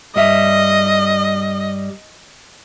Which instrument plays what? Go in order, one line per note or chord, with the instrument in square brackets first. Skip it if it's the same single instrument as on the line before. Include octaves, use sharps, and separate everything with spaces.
[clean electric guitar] G2 G3 E5 [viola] D#5